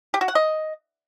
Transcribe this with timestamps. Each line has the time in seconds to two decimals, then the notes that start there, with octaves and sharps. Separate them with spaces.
0.14 G4
0.21 F#4
0.28 F#5
0.35 D#5